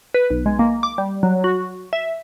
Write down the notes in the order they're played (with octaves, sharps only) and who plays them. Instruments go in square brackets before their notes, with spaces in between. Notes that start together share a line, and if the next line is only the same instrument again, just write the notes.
[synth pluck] B4
B1
G#3
A#3
D6
G3
F#3
F#4
E5